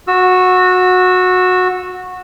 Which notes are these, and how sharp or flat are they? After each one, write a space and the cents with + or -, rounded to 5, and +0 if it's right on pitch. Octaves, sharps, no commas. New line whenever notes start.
F#4 -15 E6 +0